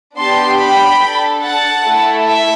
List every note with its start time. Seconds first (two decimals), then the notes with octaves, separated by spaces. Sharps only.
0.16 B3 D4 G4 A5 C6
0.59 G5 B5
1.00 D4 A4
1.42 F#5 A5
1.84 A3 E4 A4
2.26 E5